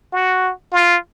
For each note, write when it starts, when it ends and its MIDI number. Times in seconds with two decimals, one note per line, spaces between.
0.13 0.52 66
0.72 0.97 65